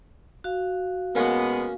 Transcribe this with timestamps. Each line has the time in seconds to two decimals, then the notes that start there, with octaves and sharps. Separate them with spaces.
0.44 F#4 F5
1.15 B2 G#3 A#3 B3 C#4 A#4